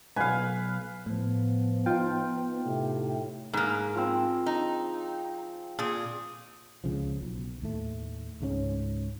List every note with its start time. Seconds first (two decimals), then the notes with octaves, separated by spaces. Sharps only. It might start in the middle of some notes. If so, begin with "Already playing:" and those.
0.16 B1 G#2 B4 F5 G#5
1.06 A2 F3 B3
1.86 D#4 F4 G5
2.65 A2 C3
3.53 G#2 A#3 G#4 B4
3.95 F3 C4
4.46 D#4
5.79 A#2 G#4
6.84 C#2 C#3 F3
7.21 B1
7.62 D#2 A2 A3
8.41 C#2 G#2 A3 C#4